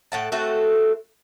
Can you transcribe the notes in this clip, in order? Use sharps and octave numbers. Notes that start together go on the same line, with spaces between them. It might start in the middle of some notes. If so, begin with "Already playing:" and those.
A2 F#5 A5
A3 C4 F#4 A4